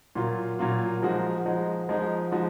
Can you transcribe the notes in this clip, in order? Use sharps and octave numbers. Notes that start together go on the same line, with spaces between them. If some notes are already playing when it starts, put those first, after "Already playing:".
A#2 F#3 A#3 F4
A#2 F#3 A#3 F4
F3 G#3 D#4 F#4
F3 G#3 D#4 F#4
F3 G#3 D#4 F#4
F3 G#3 D#4 F#4